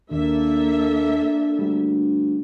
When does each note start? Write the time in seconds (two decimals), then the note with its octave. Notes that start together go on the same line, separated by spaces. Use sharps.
0.11 D#2 A#3 D4 A4 E5
1.59 D2 G3